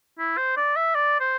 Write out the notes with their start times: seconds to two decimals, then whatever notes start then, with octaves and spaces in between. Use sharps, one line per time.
0.19 E4
0.38 C5
0.57 D5
0.76 E5
0.95 D5
1.20 C5